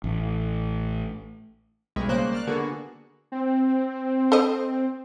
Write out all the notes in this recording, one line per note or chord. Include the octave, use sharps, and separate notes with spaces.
A1
B1 G3 G#3 B5 C#6
C#3 G3 A#3 C5 C#6 F#6
D5 F6 F#6
D3 A#3 B3 F#4 G#4 A4
C4
A4 C5 D#5